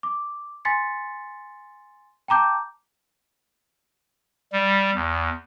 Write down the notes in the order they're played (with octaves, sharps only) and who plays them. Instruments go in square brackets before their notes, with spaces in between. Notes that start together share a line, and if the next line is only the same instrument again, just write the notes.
[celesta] D6
G#5 C6 A6 B6 C#7
G5 A5 A#5 D6 G6
[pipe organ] G3
E2